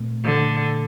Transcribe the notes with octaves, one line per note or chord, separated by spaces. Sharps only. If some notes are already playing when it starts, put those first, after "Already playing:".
Already playing: A#2 A3 C4
D3